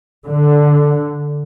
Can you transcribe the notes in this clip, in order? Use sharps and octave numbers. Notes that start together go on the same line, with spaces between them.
D3